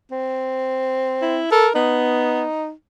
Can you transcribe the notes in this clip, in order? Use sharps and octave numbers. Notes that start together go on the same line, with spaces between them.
C4
E4
A4 A#4
B3 D#4